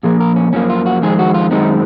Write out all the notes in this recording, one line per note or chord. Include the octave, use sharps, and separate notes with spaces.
A#2 F3 A#3 G#4
A#4
C#4
F#2 F3 A#3 C#4
F4
F#4
F2 D#3 G#3 C4 G#4
F#4
F4
F#2 D#3 G#3 C4 D#4